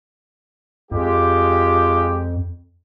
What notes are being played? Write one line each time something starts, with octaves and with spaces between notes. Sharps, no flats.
F2 G#3 F4 G4